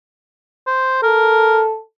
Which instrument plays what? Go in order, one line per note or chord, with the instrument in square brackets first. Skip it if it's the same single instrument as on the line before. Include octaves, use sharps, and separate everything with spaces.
[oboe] C5
[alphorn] A4 [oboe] A#4